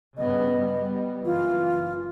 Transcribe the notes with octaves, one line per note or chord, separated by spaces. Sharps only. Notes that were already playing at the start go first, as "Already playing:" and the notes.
G2 C#3 B3 D#5
G3 B3
F#1 E3 F4